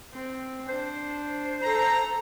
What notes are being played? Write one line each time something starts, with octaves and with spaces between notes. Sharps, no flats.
C4
D4 C5
A4 A#5